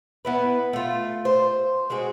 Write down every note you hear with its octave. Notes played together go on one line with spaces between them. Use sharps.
B3 E4 B4
A3 F4
C5
G#3 C4 F#4 G#4